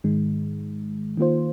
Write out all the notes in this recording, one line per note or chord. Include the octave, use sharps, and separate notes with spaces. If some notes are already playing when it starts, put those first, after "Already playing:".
G#2 D#3 G#3
D#3 A#3 F4 C5